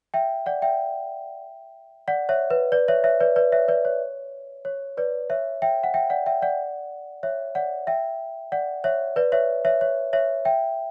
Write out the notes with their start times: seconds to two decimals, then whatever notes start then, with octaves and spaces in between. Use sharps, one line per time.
0.14 E5 G5
0.46 D5 F#5
0.62 E5 G5
2.08 D5 F#5
2.29 C#5 E5
2.50 B4
2.72 B4 D5
2.88 C#5 E5
3.04 C#5 E5
3.20 B4 D5
3.36 B4 D5
3.52 C#5 E5
3.68 B4 D5
3.85 C#5
4.65 C#5
4.97 B4 D5
5.30 C#5 E5
5.62 E5 G5
5.83 F#5
5.94 E5 G5
6.10 D5 F#5
6.26 E5 G5
6.42 D5 F#5
7.23 C#5 E5
7.55 D5 F#5
7.87 E5 G5
8.52 D5 F#5
8.84 C#5 E5
9.16 B4 D5
9.32 C#5 E5
9.65 C#5 E5
9.81 C#5
10.13 C#5 E5
10.45 E5 G5